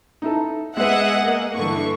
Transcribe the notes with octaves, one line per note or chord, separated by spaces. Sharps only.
D#4 E4 A4
G#3 B3 G#4 D#5 E5 F#5
A#3
G2 D3 E3 C#6